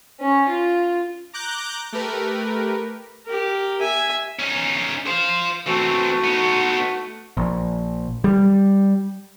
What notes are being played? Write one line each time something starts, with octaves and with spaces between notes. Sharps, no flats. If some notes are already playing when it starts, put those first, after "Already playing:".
C#4
F4
A#5 D6 F#6 G6
A3 G4 A#4 B4
G4 A#4
E5 G#5
C#4 D#4
C5 F5
E3 A3 C4 F#4
B3 D#4
A#1
G3